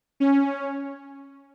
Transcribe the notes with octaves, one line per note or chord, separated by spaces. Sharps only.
C#4